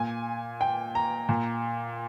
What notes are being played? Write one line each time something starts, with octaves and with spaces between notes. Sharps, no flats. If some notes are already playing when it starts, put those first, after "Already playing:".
Already playing: A#2 G#5
G5
A#5
A#2